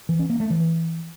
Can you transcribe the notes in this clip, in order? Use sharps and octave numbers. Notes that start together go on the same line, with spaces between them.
E3
C#4
A#3
A3
E3